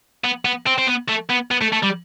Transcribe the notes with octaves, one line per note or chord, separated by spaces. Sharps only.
B3
B3
C4
C4
B3
A3
B3
B3
A3
A3
G3